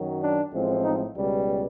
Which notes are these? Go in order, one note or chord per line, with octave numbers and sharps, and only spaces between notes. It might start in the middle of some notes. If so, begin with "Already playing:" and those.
Already playing: F#2 D#3 F#3
D4
A1 A2 F3 G#3 C4
D#4
C#2 B2 G3